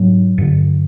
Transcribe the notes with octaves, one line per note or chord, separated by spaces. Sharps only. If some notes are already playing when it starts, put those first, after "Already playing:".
Already playing: G#2 F#3
G2 D3